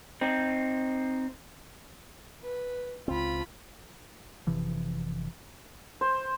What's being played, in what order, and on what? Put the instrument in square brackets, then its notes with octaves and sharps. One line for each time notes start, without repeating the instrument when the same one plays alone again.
[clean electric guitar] C4 D#4
[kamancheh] B4
[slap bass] C#2 C4 [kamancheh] F4 B5
[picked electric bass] F#1 C3 E3 F3
[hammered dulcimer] C5